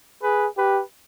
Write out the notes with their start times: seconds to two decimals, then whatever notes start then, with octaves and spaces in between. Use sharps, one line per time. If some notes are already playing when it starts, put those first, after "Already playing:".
0.23 G#4 B4
0.57 G4 B4